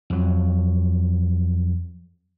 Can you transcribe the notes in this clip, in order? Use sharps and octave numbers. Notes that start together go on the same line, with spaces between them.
F2 F#3